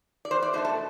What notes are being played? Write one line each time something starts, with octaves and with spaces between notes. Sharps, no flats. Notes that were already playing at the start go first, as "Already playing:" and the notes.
D5
E2 C5
D5
B2 A3 D4 C5
A4